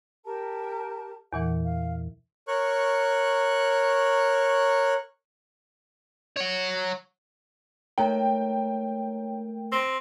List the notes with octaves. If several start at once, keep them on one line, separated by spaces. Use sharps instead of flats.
G4 A#4 A5
E2 A#2 E3 F#5
F5
A#4 C#5 C#6 F#6
C#5 F#5
A3 D#4 A#4 C#5 G5 A#5
C4 A#6